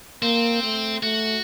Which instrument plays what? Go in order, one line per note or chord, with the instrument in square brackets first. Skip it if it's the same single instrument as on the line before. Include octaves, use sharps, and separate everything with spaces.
[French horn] A#3 [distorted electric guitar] C4
[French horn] A3
[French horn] A3 [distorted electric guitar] F#4